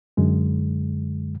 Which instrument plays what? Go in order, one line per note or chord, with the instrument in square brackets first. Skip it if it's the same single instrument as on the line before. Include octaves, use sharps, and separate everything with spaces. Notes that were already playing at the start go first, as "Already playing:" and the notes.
[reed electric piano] F#2 D3 G#3